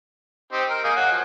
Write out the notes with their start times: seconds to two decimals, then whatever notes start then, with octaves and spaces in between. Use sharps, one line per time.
0.53 C4 D#4 G4
0.69 A#4
0.84 A#3 D#4 G#4
0.96 F#3 F#4
1.11 F3